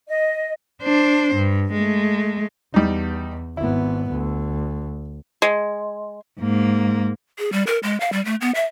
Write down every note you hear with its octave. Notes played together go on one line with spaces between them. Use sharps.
D#5
D4 C5
G2
G#3 A3
E2 G3 D#4
G#1 B3 E4
D2
G#3
G#2 A#3
G#4
G3
A#4
G#3
F5
G3
A3
B3
E5